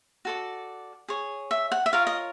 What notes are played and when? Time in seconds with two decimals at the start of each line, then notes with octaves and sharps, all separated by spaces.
0.25 F#4 A4 D5
1.08 G#4 C#5
1.51 E5
1.72 F#5
1.86 E5
1.93 F4 A#4 C#5 F5
2.07 D#5